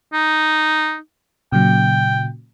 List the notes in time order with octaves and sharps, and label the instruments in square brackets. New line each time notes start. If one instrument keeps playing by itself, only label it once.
[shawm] D#4
[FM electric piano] A#2 C#3 F#3 [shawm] G5